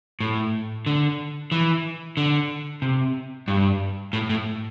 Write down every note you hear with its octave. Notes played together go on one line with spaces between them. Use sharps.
A2
D3
E3
D3
C3
G2
A2
A2